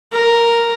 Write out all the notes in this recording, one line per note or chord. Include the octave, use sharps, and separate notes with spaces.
A#4